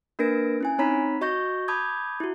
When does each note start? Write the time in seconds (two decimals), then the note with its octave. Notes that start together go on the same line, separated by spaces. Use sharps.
0.19 A#3 D4 A#4 B4 A#6 D7
0.61 C#4 E4 G#5
0.78 C4 D#4 C#5 A#5 B5 B6
1.21 F#4 D#5 C#6 G6 A#6
1.68 A5 B5 D6 D#6 G6 G#6
2.20 E4 F#4